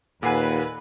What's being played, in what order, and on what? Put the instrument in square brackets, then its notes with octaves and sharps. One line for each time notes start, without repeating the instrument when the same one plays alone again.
[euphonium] D#2 [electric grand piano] A#2 G#5 [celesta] A4 F#5 C7 [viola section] B4